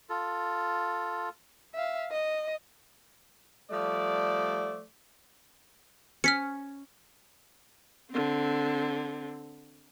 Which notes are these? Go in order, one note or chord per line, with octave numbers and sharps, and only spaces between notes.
F4 A4
E5 F5
D#5
F3 G3 A3 D5
C#4 F6 B6 C#7
D3 C4